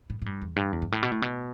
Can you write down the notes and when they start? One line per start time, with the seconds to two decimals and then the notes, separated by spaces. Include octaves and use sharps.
0.10 A2
0.22 A2
0.26 G2
0.42 E2
0.56 G2
0.72 E2
0.82 G2
0.92 A2
1.03 B2
1.12 A2
1.22 B2